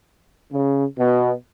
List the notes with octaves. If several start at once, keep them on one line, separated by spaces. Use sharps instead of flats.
C#3
B2